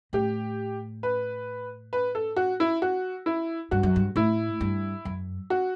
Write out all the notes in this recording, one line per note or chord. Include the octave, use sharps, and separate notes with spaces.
A2 G4
B4
B4
A4
F#4
E4
F#4
E4
G2 F#4
F#2
G2
A2 E4
G2
F#2
F#4